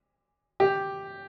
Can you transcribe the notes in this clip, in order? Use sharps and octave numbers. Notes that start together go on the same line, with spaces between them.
G4